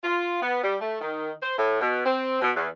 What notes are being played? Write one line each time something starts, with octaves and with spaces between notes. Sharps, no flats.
F4
B3
G3
A3
D#3
C5
A2
B2
C4
B2
E2